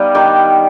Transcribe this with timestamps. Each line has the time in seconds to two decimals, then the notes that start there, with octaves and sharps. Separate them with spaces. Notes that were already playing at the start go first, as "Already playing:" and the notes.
Already playing: G3 B3 D#4 F5 G5
0.15 D#3 G4